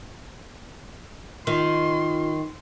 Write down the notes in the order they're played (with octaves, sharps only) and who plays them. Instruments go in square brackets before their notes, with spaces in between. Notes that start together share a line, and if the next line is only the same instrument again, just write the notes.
[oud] D#3 [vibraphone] F4 [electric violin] C6